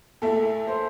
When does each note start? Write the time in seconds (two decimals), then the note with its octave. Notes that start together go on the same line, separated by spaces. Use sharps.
0.22 A#2 A3 E4 A4
0.67 C5